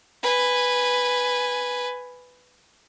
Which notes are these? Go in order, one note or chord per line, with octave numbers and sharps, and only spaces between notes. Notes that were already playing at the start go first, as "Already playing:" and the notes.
B4 G#5